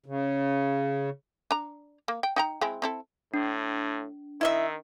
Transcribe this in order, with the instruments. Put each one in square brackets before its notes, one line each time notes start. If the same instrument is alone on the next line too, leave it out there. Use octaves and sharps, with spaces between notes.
[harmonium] C#3
[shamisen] D4 A#5
A#3
G5
D#4 G5 A#5
G#3 C4 E4
C4 E4 A4
[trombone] A2 [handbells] D4
[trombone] D#3 [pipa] E4 D#5 E5